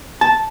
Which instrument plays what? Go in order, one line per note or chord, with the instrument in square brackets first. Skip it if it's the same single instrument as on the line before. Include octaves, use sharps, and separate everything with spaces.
[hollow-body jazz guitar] A5